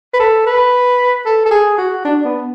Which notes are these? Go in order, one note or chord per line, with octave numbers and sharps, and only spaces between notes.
B4
A4
B4
A4
A4
G#4
F#4
D4
B3